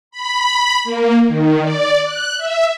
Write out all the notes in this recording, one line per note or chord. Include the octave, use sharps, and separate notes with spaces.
B5
A#3
D#3
D5
F#6
E5